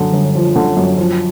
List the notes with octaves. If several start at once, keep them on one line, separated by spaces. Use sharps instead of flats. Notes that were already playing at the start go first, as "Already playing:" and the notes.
Already playing: F#2 D3
G1
F3
D3
F#2
F3